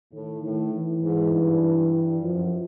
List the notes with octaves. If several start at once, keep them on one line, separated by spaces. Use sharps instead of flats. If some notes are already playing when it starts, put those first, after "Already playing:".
A2 D#3
A2 D#3
E3
G#2
G2
F#2 F3